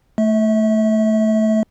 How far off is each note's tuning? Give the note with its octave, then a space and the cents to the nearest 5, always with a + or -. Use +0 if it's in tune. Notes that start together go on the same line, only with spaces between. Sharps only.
A3 +0 E5 -35